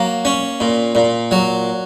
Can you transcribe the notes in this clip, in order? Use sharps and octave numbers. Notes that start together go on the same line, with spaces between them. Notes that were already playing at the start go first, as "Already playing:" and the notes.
Already playing: F#3 A#3
C#4
A#2
A#2
F#3